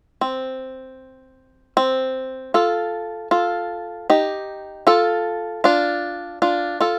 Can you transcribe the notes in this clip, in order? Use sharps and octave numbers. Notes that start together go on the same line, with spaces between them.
C4
C4
F4 A4
F4 A4
D#4 G4
F4 A4
D4 F4
D4 F4
F4 A4